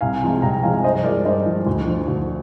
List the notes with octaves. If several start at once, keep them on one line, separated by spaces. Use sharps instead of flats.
C2 F5 G#5
C3 F3 G#3
C2 G5 A#5
C3 F3 G#3 F5 G#5
G2 C5 D#5
F3 G#3 A#4 D5
G2 C5 D#5
F3 G#3
D2
D3 F3
D2